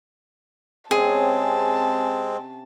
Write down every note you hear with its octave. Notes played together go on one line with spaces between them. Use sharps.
C3 G#3 C4 C#4 G#4 A5